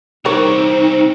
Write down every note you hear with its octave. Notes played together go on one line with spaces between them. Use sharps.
C2 E3 C4 D#4 A#4 C#5